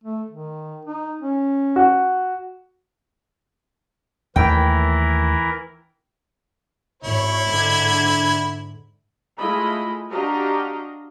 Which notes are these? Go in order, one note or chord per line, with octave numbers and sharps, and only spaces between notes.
A3
D#3
D#4
C#4
F#4
D#2 E3 A3 E4 A#4 G5
G#1 E4 C#5
G#2 D3 G#6
G#3 A3 E4 F4 D#5 B5
D4 F#4 G4 D#5 F5 A#5